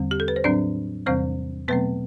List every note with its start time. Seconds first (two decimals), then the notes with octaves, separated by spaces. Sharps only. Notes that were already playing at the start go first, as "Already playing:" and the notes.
Already playing: E2 D3 G3 C4
0.11 G4
0.20 A4
0.28 B4
0.36 C5
0.44 A2 F#3 C4 D4 D5
1.06 E2 C3 E3 G3 C4 C5
1.68 B2 F#3 A3 B3 C4 B4